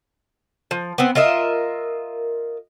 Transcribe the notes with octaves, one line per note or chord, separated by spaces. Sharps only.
F3
B3 C4
F4 A#4 D#5 E5